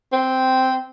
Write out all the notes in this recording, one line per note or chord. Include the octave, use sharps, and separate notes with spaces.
C4